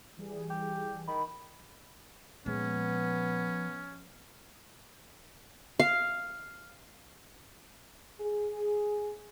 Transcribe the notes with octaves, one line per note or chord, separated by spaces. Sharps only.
E3 G3 G#4
G4
D#3 B5
A#2 F3 G#3 B3 C#4
F5
G#4